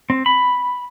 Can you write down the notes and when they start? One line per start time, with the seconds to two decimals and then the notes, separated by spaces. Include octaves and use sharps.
0.10 C4
0.26 B5